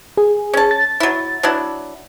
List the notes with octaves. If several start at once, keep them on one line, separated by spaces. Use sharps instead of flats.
G#4
C#4 A5
A6
F#3 E4
F#3 D4 E4